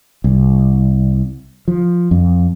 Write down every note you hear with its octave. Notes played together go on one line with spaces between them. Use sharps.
C2
F3
F2